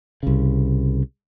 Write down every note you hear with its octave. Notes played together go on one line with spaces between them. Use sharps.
C2 C#3